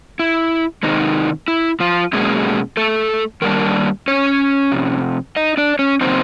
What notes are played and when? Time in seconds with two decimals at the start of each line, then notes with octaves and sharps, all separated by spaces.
0.19 E4
0.83 C3 D#3 G#3 C4 D#4
1.48 E4
1.80 F3 F4
2.13 B2 F#3 G#3 A#3 C#4 G#4
2.77 A3 A4
3.42 D#3 G3 A#3 D4 A#4
4.08 C#4 C#5
4.72 F2 C3
5.36 D#4 D#5
5.57 D4 D5
5.79 C#4 C#5
6.01 C#3 F#3 A#3 C4 D#4 C5